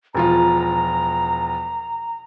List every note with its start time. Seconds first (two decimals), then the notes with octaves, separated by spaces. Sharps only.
0.15 E1 F3 F4 A#5